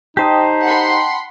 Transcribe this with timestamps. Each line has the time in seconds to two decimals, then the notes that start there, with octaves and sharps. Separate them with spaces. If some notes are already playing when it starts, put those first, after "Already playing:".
0.17 D#4 G4 C5 D#5 G5 A5
0.63 F#5 B5 C6